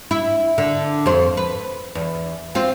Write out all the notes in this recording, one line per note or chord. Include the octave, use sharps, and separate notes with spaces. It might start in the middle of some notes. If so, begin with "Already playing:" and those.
E4
D3
F2 C5
B4
E2
C4 F4